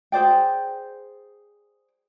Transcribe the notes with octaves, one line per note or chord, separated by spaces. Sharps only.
G#4 C5 D5 G5